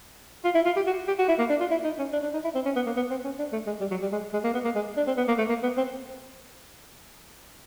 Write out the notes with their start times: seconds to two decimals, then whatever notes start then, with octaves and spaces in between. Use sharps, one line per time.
0.45 F4
0.55 E4
0.66 F4
0.76 G4
0.87 F#4
1.08 G4
1.19 F#4
1.28 E4
1.39 A#3
1.50 D4
1.60 F4
1.71 E4
1.84 D#4
1.99 C#4
2.13 D4
2.23 D4
2.34 D#4
2.44 E4
2.55 C4
2.65 C#4
2.76 B3
2.86 A#3
2.96 B3
3.10 C4
3.25 C#4
3.39 D4
3.53 A3
3.67 G#3
3.81 G3
3.91 F#3
4.02 G3
4.12 G#3
4.33 G#3
4.44 A#3
4.54 B3
4.65 A#3
4.75 G#3
4.97 D4
5.07 C4
5.17 B3
5.28 A#3
5.38 A3
5.49 A#3
5.63 B3
5.77 C4